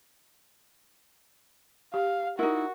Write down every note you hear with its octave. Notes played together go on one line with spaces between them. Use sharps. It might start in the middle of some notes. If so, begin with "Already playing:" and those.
G4 F5
D#4 E4 F#4 A#4